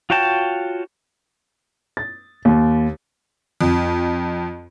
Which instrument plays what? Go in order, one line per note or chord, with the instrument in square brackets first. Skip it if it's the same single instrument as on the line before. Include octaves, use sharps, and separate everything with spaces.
[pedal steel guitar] F4 F#4 C#5 G5 A5
[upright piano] A6
D#2
[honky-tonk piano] F2